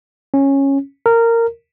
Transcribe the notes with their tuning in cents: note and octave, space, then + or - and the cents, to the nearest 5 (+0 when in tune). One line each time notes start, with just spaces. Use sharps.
C#4 -10
A#4 -15